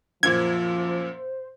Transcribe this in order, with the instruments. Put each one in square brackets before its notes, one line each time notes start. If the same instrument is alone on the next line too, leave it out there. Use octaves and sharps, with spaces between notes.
[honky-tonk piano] F#2 A#2 [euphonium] F3 [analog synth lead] C5 [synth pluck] G#6